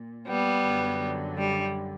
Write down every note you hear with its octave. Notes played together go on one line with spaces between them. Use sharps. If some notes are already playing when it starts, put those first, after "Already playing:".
Already playing: A#2
G3 B3
F#2 D3 F#3
G3